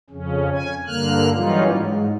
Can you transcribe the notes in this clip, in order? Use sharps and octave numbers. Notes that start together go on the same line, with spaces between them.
F2 C#3 C#4
G#5
G2 D3 A#3 F6 F#6
E3 F#3 G3 C#4 D#4 F4
G#2